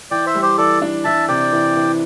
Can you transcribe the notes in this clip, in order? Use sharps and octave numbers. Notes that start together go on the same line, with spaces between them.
E3 D5 G5
C5 E5
G3
G4 C5
E3 A4 D5
D4
E3 E5 A5
C3 D5 G5
E3
E3